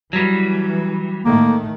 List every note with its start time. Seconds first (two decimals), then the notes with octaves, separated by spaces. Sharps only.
0.13 E3 F#3 G3
1.25 A2 D#3 A3 A#3